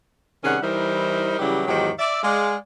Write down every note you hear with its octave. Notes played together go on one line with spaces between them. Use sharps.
C3 D#3 G3 C#4 G#4 F#5
E3 G3 D#4 E4 A#4 C5
C#3 E3 F#3 G3 E4 G4
E2 G#2 D#3 F#3 G4
D5 E5
G#3 D5 F5